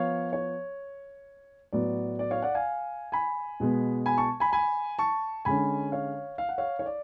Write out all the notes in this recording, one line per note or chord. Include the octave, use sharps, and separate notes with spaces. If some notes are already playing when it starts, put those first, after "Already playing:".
Already playing: F3 B3 C#5 F5
C#5
A2 F#3 B3 D5
D5
C#5 F5
D5 F#5
F5 G#5
G#5 B5
B2 G#3 B3
G#5 B5
A5 C#6
G#5 B5
G#5 B5
A5 C#6
D3 G#3 C#4 G#5 B5
C#5 F5
F5
F#5
C#5 F5
C#5
D5